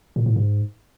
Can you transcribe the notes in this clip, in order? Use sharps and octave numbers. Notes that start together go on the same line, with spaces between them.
A#2
A2
G#2